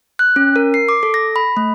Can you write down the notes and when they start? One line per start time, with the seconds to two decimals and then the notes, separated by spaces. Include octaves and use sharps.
0.19 F#6
0.36 C#4
0.56 A#4
0.74 C7
0.89 D6
1.03 A4
1.14 A#6
1.36 B5
1.57 A3